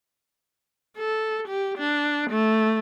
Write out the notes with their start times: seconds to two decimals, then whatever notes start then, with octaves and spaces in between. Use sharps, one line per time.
0.98 A4
1.48 G4
1.78 D4
2.30 A3